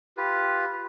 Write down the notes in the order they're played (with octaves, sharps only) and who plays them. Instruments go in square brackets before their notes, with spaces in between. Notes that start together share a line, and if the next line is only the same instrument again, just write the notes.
[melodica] F4 G4 B4